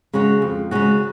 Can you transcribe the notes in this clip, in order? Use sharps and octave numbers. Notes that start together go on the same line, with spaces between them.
C#3 G#3 C#4 F#4
F2
C#3 G#3 C#4 F#4